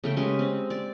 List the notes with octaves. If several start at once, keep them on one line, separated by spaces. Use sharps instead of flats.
C#3 A3 G5
G#3 C#4 G4 B4
C4
D5